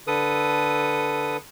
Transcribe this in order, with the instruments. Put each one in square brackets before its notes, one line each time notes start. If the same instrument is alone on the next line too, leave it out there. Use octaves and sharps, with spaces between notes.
[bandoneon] D3 A4 B4 D#6